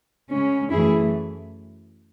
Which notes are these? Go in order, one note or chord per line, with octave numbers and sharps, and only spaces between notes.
C#3 G#3 C#4
F#2 E3 A3 E4 G#4